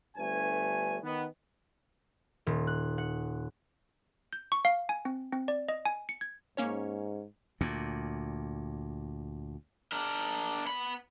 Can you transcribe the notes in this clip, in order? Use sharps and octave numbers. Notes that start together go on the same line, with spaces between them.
G1 G2 A3 B4 G#5
D#3 B3
D#1
F#6
F#5
G6
C#6
F5
G#5
C4
C4
D5
D#5
G#5
C#7
G#6
G#2 A#3 C#4 C#5
D2 A#2
D4 A#4
B3 B5